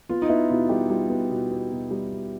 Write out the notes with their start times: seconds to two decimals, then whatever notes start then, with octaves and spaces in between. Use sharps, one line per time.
0.09 B3 F4
0.22 D#4
0.29 B3 E4
0.50 B2 F4
0.69 G3 G4
0.90 G3 F4
1.10 B3
1.30 B2
1.51 B3
1.71 B2
1.91 G3
2.11 B2